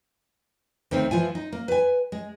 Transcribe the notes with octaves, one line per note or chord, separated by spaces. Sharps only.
D2 D#3 C4 D#4
E3 F3 F4 G#5
D#4
A#3
B4 G#5
G#3